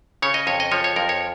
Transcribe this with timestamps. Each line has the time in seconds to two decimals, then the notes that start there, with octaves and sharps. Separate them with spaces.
0.22 C#3 C#5
0.34 D#5
0.47 F2 C#5
0.60 D#5
0.72 F3 C#5
0.84 C#5
0.96 F2 A#4
1.09 C#5